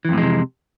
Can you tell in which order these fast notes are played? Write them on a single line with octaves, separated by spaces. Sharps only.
E3 F2 A2 G#3 C3